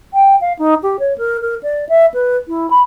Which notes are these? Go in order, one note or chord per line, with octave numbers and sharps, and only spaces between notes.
G5
F5
D#4
G4
C#5
A#4
A#4
D5
E5
B4
E4
B5